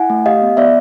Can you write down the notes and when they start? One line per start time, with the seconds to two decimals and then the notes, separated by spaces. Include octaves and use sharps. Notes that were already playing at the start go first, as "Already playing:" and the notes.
Already playing: E4 F#5 G#5
0.10 A3
0.26 G4 D#5 F5
0.42 B3
0.57 B3 D5 E5